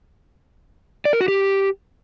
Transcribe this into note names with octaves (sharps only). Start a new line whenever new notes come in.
D5
A#4
F#4
G4